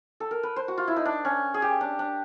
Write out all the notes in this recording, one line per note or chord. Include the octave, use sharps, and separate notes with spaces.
A4
A#4
B4
C5
F#4
F4
E4
D#4
D4
C#4
G#4
G4
D4
D4